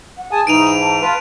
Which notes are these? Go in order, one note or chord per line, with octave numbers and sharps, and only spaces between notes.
F#5
G#4 G#5 A5 D#6
G#2 E3 D#4 D7 D#7 F7
F7
A5
F4 B4 A5